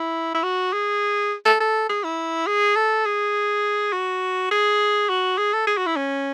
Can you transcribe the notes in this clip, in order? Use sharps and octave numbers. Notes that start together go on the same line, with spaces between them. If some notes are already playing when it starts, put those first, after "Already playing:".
Already playing: E4
E4
F#4
G#4
A4
A4
G#4
E4
G#4
A4
G#4
F#4
G#4
F#4
G#4
A4
G#4
F#4
E4
C#4